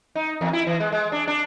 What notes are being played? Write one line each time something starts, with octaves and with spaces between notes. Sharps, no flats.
D#4
E2
E4
E3
G#3
G#3
D4
D4